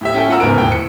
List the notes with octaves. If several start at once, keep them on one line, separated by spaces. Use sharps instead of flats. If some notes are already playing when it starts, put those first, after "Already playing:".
A2 G4 E5
C#4 E4 A4 G5
A3 F4 F#5 A#5 E6
D1 G#2 C#3 B3 A#4 D7
D#1 A2 G5
C#7